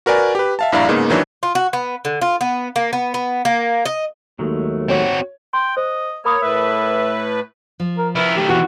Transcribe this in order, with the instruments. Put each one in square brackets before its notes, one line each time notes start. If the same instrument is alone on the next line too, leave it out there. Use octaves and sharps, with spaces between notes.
[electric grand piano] F#4 A#4 B4 D5 G#5
G4 B4
E5 F5 A5
A#1 G2 E4 D5 F5 A#5
G#2 C#3 A#3 B3 D#4
D#3 E3 F#3 D4
[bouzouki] F4
F#4
B3
D3
F4
B3
A#3
B3
B3
A#3
D#5
[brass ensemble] D#2 [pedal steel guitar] F#3 G#3 A3
[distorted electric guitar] C4 F#4 [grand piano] C#5
[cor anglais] G5 [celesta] C6
[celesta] C5 [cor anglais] D#5
[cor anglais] A#3 [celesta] A#4 B5 D#6 [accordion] C#5
[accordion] A2 A3 B4 [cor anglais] E5
[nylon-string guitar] F3
[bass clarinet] A#4
[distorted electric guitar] E4 A#4 [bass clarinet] B4
[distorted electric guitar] D#3 A3 [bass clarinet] G4
[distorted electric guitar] D#2 E3 [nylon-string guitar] B2 [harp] F#4